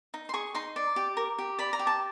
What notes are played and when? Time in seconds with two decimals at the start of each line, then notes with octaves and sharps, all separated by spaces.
0.14 D#4
0.29 C6
0.34 G#4 C#6
0.55 D#4 C6
0.76 D5
0.96 G4
1.17 A#4
1.39 G4
1.59 D5 B5
1.73 A#5
1.79 G4
1.87 A5